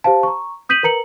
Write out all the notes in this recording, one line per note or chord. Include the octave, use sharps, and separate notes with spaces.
G4 C5 F5 A5
A#5 C#6
D#6 G6 B6 D#7 F#7
A#4 B4 A#5 C#7 F#7